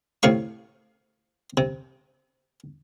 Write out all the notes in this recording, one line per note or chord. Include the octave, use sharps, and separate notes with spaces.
A2 C3 F5 C#6
C3